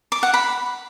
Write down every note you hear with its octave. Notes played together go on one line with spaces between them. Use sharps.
D6
F#5
B5